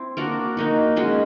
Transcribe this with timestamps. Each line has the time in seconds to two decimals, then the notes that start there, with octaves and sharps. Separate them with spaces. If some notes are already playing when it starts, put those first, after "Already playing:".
Already playing: C4 E4
0.17 A#3 D4 F#4 A#4
0.57 A#3 D#4 F#4
0.96 G#3 C#4 F#4